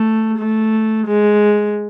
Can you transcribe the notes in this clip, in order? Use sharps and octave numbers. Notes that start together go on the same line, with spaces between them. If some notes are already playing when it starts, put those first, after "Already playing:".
Already playing: A3
A3
G#3